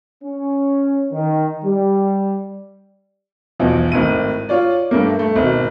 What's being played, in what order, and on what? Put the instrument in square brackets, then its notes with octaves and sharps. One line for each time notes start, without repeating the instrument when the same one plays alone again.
[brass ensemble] C#4
D#3
G3
[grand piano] B1 E2 F3
G#1 A2 D#7
F4 C#5 D5
G2 A3 A#3
A3
G#1 B2